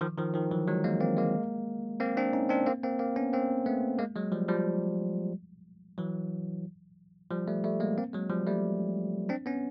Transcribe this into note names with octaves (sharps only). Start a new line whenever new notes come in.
D#3 F3
D#3 F3
D#3 F3
E3 F#3
F#3 G#3
G#3 A#3
A#3 C4
G#3 A#3
A#3 C4
C4 D4
C#4 D#4
C4 D4
A#3 C4
A#3 C4
A#3 C4
B3 C#4
A#3 C4
A3 B3
G#3 A#3
F#3 G#3
F3 G3
F3 G3
E3 F#3
F3 G3
G3 A3
G3 A3
G#3 A#3
A#3 C4
F#3 G#3
F3 G3
G3 A3
C4 D4
B3 C#4